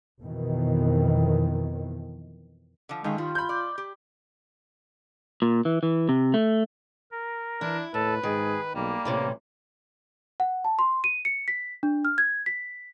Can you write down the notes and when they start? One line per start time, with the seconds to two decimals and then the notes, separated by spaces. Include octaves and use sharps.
0.21 F2 B2 D#3 E3
2.89 D3 F3
3.04 D#3 G#3 A3 C#4 F5
3.18 G3 F4
3.35 B5 G6
3.49 D5
3.78 G4
5.42 A#2
5.65 E3
5.83 E3
6.09 C3
6.34 A3
7.11 A#4
7.61 E3 D4 E4
7.94 D#2 A2 A4 B4 A5
8.23 G#2 D#3 G#4
8.75 B1 G3 A#3
9.05 A1 A2 C3 E3
10.40 F#5
10.65 A5
10.79 C6
11.04 D#7
11.25 C#7
11.48 B6
11.83 D4
12.05 F6
12.18 G#6
12.46 B6